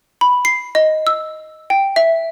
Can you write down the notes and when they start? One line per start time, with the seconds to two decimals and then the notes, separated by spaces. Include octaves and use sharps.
0.21 B5
0.45 C7
0.75 D#5
1.07 E6
1.70 G5
1.96 E5